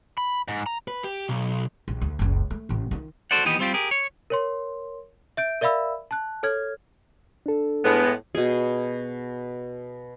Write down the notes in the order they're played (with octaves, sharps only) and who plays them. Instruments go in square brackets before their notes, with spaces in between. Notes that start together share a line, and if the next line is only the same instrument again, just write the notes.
[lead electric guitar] B5
G#2
A#5
B4
G4
B1
[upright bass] A#1
D2
F#1 C#2
A3
A1 A2
D#3 F4
[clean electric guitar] F#4 A4 C5 D5 F#5
D#2 E3 B3 G4 D#5
G3 C4 F4 G4
G4 G#4 A#4
C#5
[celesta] A#4 C#5 C6
E5 G6 D7
A#4 D5 E5 F5 B5 E6
A5 F#6
A4 C#5 F6 G#6
[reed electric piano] D4 A4
[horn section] A2 G#3 B3
[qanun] B2 G#4